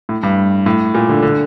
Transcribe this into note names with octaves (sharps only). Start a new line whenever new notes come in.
A2
G2
A2
A#2
D3
D3